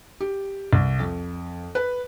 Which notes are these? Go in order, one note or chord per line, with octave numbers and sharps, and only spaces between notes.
G4
C2
F2
B4